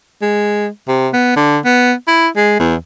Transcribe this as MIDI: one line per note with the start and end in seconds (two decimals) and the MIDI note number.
0.22 0.68 56
0.88 1.08 48
1.13 1.34 59
1.36 1.58 50
1.65 1.92 59
2.08 2.28 64
2.37 2.55 56
2.59 2.75 40